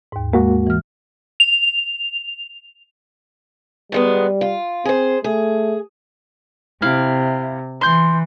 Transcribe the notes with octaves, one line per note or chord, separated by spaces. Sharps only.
D#2 G#2
G#3 A#3 F#4
E3 F6
F7
D#3 G3 G#3 B3
F4
C4 G#4 C5
A3 G#4
C3 E4 F5
E3 C6 G6